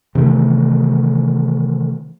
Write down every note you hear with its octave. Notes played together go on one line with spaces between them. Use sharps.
C3 D#3 E3 A3